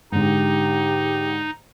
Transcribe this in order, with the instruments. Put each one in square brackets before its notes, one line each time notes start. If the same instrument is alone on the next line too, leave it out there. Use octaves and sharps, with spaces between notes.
[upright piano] G#2 D3 [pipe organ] D#4 [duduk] G4